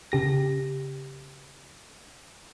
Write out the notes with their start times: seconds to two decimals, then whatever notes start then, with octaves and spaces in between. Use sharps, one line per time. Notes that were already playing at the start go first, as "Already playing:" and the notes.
0.12 C#3 G4 A#6